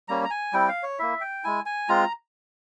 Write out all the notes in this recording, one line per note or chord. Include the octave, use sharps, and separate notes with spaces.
G3 A#3 C#4 A#5
A#5
G#5
G3 C4 E4 G5
F5
C#5
A#3 E4 E5
G5
G#3 E4 G#5
G#5
G#3 C4 F4 A#5